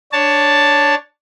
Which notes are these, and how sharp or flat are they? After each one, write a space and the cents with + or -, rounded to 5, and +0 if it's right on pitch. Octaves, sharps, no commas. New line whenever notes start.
D4 +0 C#5 +10 A5 +0